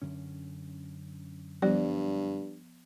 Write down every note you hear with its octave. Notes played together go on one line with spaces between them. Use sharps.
F#2 D3 C#4
G2 F3 G3 B3 D5